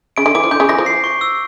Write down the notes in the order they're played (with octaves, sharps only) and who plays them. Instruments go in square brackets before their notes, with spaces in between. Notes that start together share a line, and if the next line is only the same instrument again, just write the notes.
[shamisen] C#3 [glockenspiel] D7
[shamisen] D3
[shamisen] E3 [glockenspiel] D6
[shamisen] F3
[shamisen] D3 [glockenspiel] G6
[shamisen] C#3
[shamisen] E3 [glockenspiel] A#6
[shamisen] F3
[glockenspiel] C7
C#6
E6